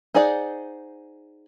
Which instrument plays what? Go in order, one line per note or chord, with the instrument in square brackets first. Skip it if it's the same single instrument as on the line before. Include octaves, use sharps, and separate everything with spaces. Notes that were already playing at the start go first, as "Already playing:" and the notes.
[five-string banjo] D#4 G#4 C5 D5 F#5